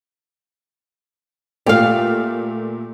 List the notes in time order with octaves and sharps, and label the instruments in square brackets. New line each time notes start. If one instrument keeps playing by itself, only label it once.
[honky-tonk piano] A#2 A3 [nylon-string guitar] G4 F5